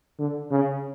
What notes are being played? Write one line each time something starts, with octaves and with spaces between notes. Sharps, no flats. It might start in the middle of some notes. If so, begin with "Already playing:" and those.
D3
C#3